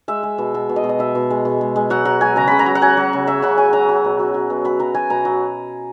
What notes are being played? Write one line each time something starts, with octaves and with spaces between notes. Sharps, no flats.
G#3 E5
G#3
B2
B2 E5
B2
D#5
B2
D#5
B2 E5
B2
G#3
B2
G#3
G#3
F#3 F#5
F#3 F#5
F#3 G#5
C#3 A#5
C#3 B5
A#5
F#3
F#5
F#3 G#5
F#3
C#3
C#3 E5
C#3 F#5
F#3 G#5
F#3 A#5
F#3
B2
F#3
F#3
B2
F#3 B5
F#3 A#5
F#3 G#5
B2 A#5
F#3